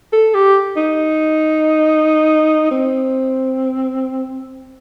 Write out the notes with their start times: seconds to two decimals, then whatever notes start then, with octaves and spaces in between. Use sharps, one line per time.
0.13 A4
0.34 G4
0.76 D#4
2.71 C4